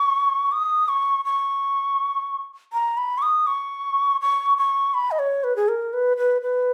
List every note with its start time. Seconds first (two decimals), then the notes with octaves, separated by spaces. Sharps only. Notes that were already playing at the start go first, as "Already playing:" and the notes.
Already playing: C#6
0.52 D#6
0.89 C#6
1.25 C#6
2.73 A#5
2.97 B5
3.18 C#6
3.22 D#6
3.47 C#6
4.21 C#6
4.58 C#6
4.94 B5
5.11 D#5
5.19 C#5
5.44 B4
5.56 G#4
5.68 A#4
5.93 B4
6.17 B4
6.42 B4